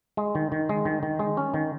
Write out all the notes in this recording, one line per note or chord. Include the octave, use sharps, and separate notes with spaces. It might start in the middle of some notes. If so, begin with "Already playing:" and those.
G#3
D#3
D#3
G#3
D#3
D#3
G#3
C#4
D#3